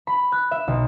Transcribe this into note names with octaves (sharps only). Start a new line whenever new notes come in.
B5
F#6
E5
B1